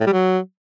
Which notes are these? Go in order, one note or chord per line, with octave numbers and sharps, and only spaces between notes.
A2
G3
F#3